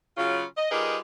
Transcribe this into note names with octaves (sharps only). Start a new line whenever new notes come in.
C#3 F#3 F4
D#5
G3 D#4 F4 G#4 A#4 B4